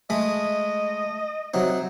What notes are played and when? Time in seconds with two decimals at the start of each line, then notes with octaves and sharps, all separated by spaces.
0.10 G#3 A3 D#5 B5
1.54 C3 F#3 D#4